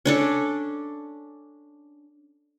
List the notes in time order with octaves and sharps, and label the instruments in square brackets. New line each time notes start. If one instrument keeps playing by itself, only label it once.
[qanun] C#4 D4 A4